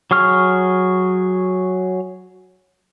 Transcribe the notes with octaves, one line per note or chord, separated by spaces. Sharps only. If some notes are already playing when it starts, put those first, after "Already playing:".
F#3 G#4 C#6 F6